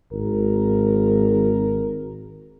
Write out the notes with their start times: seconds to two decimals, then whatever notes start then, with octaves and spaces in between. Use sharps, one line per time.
0.13 G#1 A#4